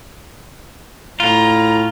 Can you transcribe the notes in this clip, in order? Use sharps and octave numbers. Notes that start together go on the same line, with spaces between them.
A2 F4 A#5